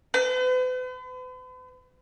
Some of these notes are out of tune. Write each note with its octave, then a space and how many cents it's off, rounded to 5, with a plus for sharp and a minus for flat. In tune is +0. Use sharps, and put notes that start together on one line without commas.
B4 +45